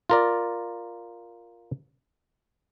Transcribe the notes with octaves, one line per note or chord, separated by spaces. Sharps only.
F4 A#4 D5